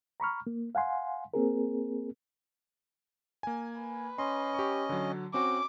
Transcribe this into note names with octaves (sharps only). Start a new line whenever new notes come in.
A#5 B5 C#6 F6
A#3
F5 F#5 G#5 C6
A#3 C4 G#4 A#4
A#3 G#5
B4
C#4 D#5 C6
G4 C#6
D3 F#3
C4 C#4 F#4 D6